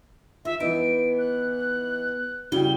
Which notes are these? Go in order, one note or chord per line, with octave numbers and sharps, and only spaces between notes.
D#3 F4 E5
E3 B3 D#4 D7
F#6
C#3 G3 E4 F#4 G5 G7